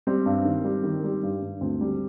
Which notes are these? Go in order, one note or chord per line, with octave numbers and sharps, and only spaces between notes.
G3 C4
G2
D#3
G3
D#3
G3
G2
G2
D2 C4
G3